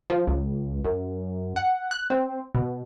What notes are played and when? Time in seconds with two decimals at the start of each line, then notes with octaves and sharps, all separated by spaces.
0.10 F3
0.27 C#2
0.84 F#2
1.56 F#5
1.91 F#6
2.10 C4
2.55 B2